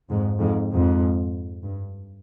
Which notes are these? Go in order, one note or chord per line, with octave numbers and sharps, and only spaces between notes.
F2 G#2
F2 G#2
F2 G#2
G2